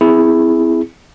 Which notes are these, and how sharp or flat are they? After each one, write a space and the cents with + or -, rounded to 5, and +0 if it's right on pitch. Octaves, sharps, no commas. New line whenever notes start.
C4 -30 E4 +0 G#4 +0